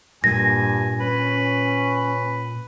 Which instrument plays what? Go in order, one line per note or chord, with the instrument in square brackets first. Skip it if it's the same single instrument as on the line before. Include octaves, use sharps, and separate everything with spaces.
[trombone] G2 [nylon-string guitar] A#2 [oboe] G#5 [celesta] A#6
[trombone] C#4 [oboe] B4